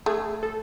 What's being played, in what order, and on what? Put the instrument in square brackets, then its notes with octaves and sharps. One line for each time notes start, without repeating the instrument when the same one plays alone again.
[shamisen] A3 [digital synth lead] G#4
[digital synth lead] A4